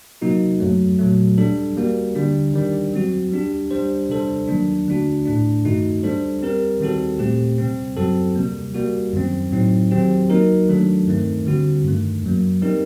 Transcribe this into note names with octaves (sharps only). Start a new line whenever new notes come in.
C3 F#3 A#3 D#4 F#4
F#2 F#3 A3
A#2 F#3 A3
G3 D4 A4
G3 A#3 F#4
D3 G3 D4
D#3 G3 D4
F#3 C4 F#4
G3 D4 G4
G3 D4 G4 C5
C3 G3 D4 A4 C5
D#3 F#3 A#3 D4
D3 A3 D4 F#4
A2 A3 D4
G2 D#3 A3 D#4 F#4
G3 D4 A4 C5
G3 C4 G4 A#4
D#3 G3 C4 F#4 A4
A#2 A3 C4 G4
C3 G3 C4
F#2 F#3 C4 F#4 A4
C3 G3 A#3
G3 A#3 F#4
F#2 D#3 F#3 C4
A2 F#3 C4 D#4
D#3 F#3 C4 G4
F#3 A#3 D#4 F#4 A#4
D#3 F#3 A3 D4 A4
G2 D#3 A3 C4
D3 G3 C4 F#4
G2 D#3 A3
F#2 F#3 A#3
G3 C4 D#4 G4 A#4